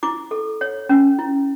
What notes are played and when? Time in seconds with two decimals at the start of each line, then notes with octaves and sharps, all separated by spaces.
0.03 E4 D6
0.31 A4
0.61 C#5
0.89 C#4
1.19 E4